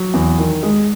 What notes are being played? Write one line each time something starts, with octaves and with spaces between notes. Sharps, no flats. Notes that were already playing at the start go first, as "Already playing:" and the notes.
Already playing: F#3
E2
D#3
G#3